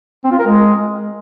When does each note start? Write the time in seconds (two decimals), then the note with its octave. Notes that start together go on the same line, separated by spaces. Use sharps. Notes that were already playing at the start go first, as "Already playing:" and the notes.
0.24 C4
0.32 F4
0.39 A#4
0.46 G#3